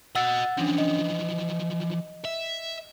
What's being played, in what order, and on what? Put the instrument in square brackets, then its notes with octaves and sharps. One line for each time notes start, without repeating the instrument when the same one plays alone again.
[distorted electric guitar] F#4 D#5 [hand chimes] F#5 E6 A6
[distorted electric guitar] E3 F3 [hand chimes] C#4 D4
[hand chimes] D#5
[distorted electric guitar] E5